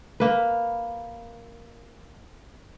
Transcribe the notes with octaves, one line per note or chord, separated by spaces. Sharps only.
A#3 B4